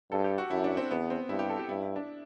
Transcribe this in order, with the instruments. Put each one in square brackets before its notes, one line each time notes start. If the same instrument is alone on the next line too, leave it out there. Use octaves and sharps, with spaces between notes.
[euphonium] G2 [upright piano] A4
[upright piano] G4
F#4
[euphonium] F#2 [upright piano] E4
[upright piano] D4
C4
[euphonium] E2 [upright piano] B3
[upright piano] C4
[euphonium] G2 [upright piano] E4
[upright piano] G4
A4
G4
[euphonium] G2 [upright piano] E4
[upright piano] E4
D4